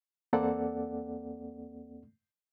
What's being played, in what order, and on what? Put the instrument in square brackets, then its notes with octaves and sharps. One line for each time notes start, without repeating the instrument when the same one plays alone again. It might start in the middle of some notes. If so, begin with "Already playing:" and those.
[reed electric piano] E2 A#3 C4 A4 D5 F#5